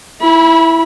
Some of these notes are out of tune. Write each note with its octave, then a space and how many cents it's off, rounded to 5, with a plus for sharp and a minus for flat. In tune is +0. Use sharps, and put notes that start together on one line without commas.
E4 +0 B5 -25